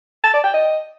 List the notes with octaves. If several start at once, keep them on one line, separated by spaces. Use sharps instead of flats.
A5
D5
G5
D#5